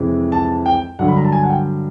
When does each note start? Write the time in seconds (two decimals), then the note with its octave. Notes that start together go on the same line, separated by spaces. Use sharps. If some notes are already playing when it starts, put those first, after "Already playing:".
Already playing: F2 C3 E3 G#3
0.32 A5
0.66 G5
0.99 G2 D3 F#3 F#5
1.08 B5
1.17 A#5
1.25 A5
1.32 G#5
1.44 F#5
1.50 G5